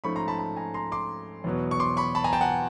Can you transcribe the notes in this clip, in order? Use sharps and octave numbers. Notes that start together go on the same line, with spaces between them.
G#2 F3 A3 C#4 B5 C#6
A#5 C6
A5 B5
A5 B5
G#5 A#5
A#5 C6
C6 D6
E2 B2 F#3 B3
C#6
C6 D6
B5 C#6
A5 B5
G#5 A#5
G5 A5
F#5 G#5